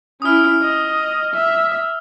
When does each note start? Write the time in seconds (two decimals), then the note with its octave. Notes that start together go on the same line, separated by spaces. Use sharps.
0.22 C#4 E4 D#6 F6
0.62 D#5
1.34 E5